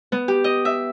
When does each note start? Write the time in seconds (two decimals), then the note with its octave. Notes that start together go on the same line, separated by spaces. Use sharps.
0.12 B3
0.28 G4
0.44 D#5
0.65 E5